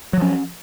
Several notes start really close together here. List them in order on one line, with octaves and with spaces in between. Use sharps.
F#3 F3 C#4